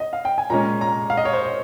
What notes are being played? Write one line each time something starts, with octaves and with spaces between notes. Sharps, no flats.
D#5
F5
G5
G#5
A#2 G#3 C#4 A#5
A#5
F5
D#5
C#5
C5